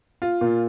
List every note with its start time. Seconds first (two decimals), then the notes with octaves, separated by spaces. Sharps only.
0.22 F4
0.41 A#2